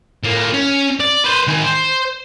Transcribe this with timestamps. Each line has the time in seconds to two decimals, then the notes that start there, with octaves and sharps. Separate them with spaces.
0.23 A2 A#3
0.53 C#4
1.00 D5
1.24 B4 C5
1.48 D#3 G#4
1.64 C5